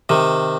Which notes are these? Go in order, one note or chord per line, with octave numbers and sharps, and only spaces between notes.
C3 D#3